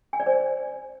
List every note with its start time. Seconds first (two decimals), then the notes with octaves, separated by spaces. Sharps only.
0.13 G#5
0.20 D5
0.26 C5